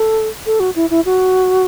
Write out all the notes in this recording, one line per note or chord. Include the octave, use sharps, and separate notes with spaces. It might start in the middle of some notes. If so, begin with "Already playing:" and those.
Already playing: A4
A4
F#4
E4
E4
F#4